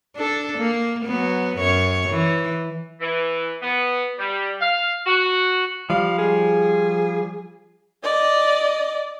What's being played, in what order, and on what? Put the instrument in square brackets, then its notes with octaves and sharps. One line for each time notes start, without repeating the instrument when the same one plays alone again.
[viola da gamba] D4 A4
A#3
F#3 B3
F#2 C#5
E3
[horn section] E3
B3
G3
F5
F#4
[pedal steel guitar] F3 G3 [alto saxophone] F5
[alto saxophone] G#4
[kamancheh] D5 D#5